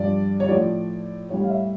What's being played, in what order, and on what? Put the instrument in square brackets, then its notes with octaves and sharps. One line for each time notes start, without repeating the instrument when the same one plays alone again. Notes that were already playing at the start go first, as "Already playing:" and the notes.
Already playing: [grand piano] G2 F3 D5
C#5
A2 F3 D5
A2 G3 C#5
F5
E5